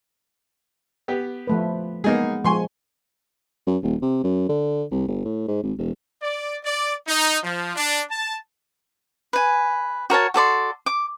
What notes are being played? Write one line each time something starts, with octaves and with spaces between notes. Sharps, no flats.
B3 G4
F3 A3 B4
G#3 A#3 B3 D#4 G#4
F3 G#3 G#5 C6 C#6
F#2
D#1
C3
F#2
D3
C2
G1
A2
G#2
G#1
E1
D5
D5
D#4
F3
D4
A5
B4 G#5
F#4 A#4 C#5 A5
F#4 A4 D5 C6
D6